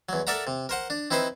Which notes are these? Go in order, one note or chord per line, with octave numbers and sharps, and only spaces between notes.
E2 F#3
A4 A#4 D5 E5 F#5 A#5
C3
A#4 C5 F#5
D4
C4 D#4 E4 B4 C5